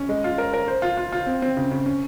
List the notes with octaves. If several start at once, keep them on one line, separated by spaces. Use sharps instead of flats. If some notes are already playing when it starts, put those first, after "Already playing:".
Already playing: C#4
G#3
F4
A#4
A#4
C5
F4
F4
F4
C4
C4
C#3
C#3
C#4